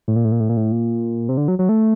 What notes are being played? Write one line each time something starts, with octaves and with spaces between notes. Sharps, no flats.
A2
A#2
A2
A#2
A2
A#2
A2
A#2
C3
D3
F#3
F#3
A3